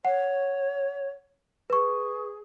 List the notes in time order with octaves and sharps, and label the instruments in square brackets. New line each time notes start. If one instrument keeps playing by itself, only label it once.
[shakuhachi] C#5 [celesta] F#5
[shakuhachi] G#4 [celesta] B4 C#6